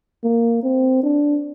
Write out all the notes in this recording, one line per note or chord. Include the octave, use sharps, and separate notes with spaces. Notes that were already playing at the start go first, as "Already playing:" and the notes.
A#3
C4
D4